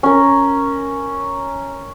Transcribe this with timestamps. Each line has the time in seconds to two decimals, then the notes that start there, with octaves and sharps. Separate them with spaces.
0.03 C#4 A#4